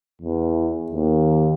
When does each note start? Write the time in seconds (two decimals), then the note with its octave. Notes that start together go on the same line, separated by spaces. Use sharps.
0.21 E2
0.91 D#2